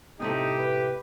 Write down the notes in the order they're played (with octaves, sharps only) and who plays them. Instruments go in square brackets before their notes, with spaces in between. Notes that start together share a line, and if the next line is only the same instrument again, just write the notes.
[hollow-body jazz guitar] A2 C3 A3 [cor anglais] D#4 [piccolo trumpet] G4
[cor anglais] B4